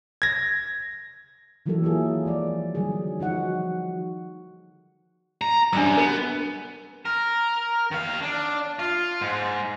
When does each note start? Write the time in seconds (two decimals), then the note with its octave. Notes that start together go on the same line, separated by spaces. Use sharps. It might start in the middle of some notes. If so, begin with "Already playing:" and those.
0.22 G#6 A#6
1.66 D#3 E3 F#3 A#3 G4 A4
1.83 A#3 E4 F4 G#4
2.25 F3 G#3 D5
2.75 D3 D#3 F#3 G3 G#4
3.20 D#3 F3 D#4 F#4 F#5
5.41 A#5
5.73 F#2 G3 D4 E6
5.97 B3 A#4
7.05 A#4
7.91 D#3 F5
8.22 D4
8.79 F4
9.21 G#2